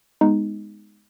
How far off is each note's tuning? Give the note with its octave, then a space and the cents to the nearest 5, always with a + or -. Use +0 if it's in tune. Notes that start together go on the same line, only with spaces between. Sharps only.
G#3 +0 B3 +0 D#4 +0